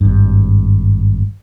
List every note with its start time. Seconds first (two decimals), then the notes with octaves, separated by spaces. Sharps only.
0.01 G#1 G2